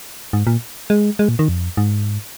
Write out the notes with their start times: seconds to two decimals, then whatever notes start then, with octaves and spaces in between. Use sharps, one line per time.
0.33 G#2
0.47 A#2
0.90 G#3
1.19 G#3
1.28 A#2
1.39 D#3
1.49 F2
1.77 G#2